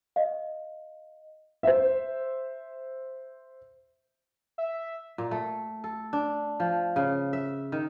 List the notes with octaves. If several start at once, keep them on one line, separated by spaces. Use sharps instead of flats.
D#5 F5
C5 E5
E5
A#2
A3
A4
D4
F3
C#3
E5
D#3